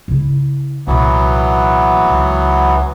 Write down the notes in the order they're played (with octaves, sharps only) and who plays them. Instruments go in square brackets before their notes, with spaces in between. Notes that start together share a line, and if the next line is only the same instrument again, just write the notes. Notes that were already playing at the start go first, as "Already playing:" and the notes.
[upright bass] C#3 E4
[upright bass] C2 A#2 [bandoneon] E3 F#3 B3
[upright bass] C#2 D#3